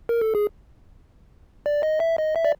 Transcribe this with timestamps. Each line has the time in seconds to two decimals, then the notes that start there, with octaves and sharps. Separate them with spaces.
0.09 A#4
0.21 A4
0.35 G#4
1.66 D5
1.83 D#5
2.00 E5
2.18 D#5
2.36 E5
2.45 D5